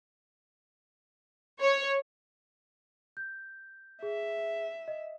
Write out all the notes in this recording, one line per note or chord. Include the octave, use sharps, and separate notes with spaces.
C#5
G6
G#4 E5
D#5